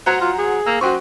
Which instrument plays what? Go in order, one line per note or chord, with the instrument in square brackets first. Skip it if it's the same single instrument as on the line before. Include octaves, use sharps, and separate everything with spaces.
[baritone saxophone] F#3 [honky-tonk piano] C5 F#5 A#5
[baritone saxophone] F#3 [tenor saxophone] F4
[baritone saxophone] F#3 [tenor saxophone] G#4
[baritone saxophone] A#3 [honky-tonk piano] E6
[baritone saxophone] F#2 [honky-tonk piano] F#4 G5 C#6 [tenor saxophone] C5